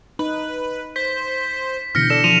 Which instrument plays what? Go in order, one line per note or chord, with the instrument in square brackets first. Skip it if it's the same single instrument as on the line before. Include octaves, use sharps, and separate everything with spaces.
[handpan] D#4 [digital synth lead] B4
[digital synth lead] C5 [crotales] B6
[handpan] B2 D3 E3 [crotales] F6 A#6 C#7 [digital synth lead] G6
[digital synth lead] A4 [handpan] D5 [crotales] C#7 E7
[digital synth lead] F3 [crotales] D#7 F7